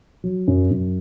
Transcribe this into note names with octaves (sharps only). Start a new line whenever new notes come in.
F#3
F#2
F#2